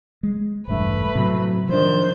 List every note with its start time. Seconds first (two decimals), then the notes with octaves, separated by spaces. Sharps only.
0.23 G#3
0.68 E1 A1 G2 A3 B4
1.15 A2 C3 F#3 C4
1.69 C2 D#3 F3 D4 C5 G6